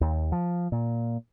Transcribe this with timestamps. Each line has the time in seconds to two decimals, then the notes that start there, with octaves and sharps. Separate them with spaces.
0.01 D#2
0.32 F3
0.72 A#2